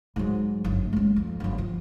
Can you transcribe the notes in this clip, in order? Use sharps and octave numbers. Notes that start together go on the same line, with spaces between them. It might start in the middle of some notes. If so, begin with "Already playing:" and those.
G#2 F#3
G1 F#2
G#3 C#4
F2
G1 F#2
F3